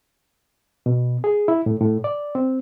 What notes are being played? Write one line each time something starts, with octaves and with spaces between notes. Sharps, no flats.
B2
G#4
E4
A2
A2
D5
C4